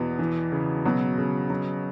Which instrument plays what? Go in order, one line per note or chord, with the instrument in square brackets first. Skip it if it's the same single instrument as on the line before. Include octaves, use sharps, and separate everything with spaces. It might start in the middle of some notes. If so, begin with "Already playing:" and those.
Already playing: [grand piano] E2 [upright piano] B2
[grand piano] E3
C#3
[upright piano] B2 [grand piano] F#3
[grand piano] C#3
F#3